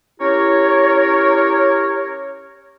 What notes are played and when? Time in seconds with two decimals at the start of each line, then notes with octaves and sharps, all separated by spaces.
0.21 C#4 E4 G4 A#4 C#5